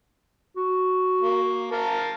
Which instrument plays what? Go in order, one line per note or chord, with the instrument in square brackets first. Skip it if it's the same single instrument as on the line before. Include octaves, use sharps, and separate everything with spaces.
[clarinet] F#4
[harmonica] A#3
A#4 F5 A5